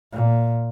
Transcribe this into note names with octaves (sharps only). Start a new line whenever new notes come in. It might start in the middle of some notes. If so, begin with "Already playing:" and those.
A#2